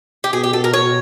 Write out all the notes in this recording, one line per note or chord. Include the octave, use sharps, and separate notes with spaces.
G4
B2 G#4
G4
B2 A4
A#4
B2 C#5